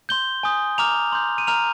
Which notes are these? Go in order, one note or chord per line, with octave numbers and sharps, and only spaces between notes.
C6 G6 G7
G#5 D#6 G6
A#5 D6 F6 F7
C6 G6
D#7
A#5 F6 F7